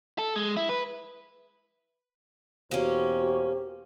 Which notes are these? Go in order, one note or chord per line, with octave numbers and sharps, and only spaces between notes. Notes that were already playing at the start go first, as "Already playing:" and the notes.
A4
G#3
E4
B4
E2 B2 A#3 C#4 F#4 G4 C5